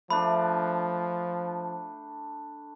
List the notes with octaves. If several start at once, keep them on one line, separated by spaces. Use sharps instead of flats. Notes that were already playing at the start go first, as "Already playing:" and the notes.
F3 A3 D4 B5